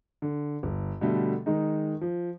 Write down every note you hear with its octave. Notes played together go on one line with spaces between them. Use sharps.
D3
G1
B2 D3 G3 A3
D#3 G#3 D#4
F3